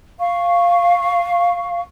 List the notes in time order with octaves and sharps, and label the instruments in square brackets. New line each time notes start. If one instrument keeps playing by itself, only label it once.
[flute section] F5 C#6